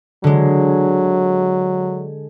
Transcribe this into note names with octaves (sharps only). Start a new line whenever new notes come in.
D3 F#3 G#3